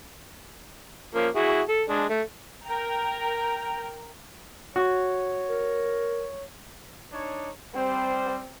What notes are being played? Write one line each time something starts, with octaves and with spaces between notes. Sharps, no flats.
F3 A#3 C#4
E4 F#4 G#4
A4
G#3 D4
A3
A#4 G5 A#5
F#4 C#5
A#4
D4 D#4 C#5
G3 C4 C5